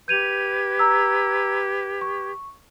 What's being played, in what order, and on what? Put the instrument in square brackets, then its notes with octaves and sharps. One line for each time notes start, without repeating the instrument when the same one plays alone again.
[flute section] G4 B4 G#6 [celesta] G6 D#7 F7
[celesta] A#5 E6
C#6